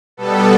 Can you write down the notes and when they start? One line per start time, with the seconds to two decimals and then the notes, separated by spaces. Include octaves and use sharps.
0.17 B2 G3 B3 A4